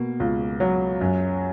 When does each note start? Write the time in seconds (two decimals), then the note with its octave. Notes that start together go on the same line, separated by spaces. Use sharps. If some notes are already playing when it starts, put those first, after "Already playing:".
Already playing: B2 A#3
0.20 C#2
0.60 F#3
1.01 F#2